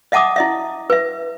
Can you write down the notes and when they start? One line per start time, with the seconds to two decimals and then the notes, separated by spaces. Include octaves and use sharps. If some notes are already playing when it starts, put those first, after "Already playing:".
0.12 D#5 E5 F#5 A5 D6 D#6
0.36 E4 D#5 E5
0.90 B4 E5